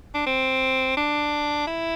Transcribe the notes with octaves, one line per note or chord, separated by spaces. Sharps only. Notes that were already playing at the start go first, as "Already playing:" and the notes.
D4
C4
D4
E4